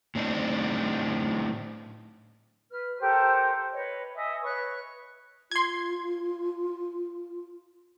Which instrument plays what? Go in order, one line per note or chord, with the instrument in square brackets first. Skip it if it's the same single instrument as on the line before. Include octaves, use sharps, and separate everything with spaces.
[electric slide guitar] A2 C4 D4 D#4
[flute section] B4 F6
G4 A4 A#4 C5
B4 C#5 D#5
D#5 E5 G#5 D#6
B4 C#5 C#6 F#6
[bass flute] F4 [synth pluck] C6 G#6